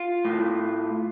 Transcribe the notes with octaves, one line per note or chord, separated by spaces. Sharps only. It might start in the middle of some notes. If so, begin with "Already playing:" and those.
Already playing: F4
A2